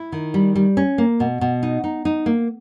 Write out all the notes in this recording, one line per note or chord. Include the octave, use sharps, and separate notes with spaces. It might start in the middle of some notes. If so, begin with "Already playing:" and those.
Already playing: E4
D#3
G3
G3
C#4
A#3
B2
B2
D#4
D#4
D#4
A#3